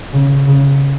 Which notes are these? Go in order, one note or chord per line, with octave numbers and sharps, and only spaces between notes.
C#3
C#3